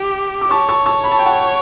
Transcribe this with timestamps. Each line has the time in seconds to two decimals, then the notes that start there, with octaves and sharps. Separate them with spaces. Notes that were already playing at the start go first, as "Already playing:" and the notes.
Already playing: G4
0.41 D6
0.51 C#5 A5 C#6
0.68 A5 C#6
0.86 A5 C#6
1.04 B5
1.12 A5
1.19 G5
1.26 F#5 A5